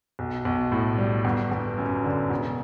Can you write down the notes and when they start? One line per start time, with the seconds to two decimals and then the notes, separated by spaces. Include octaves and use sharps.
0.19 B1
0.45 B1
0.72 A2
0.99 G3
1.25 G1
1.51 G1
1.78 F#2
2.04 D3
2.30 E1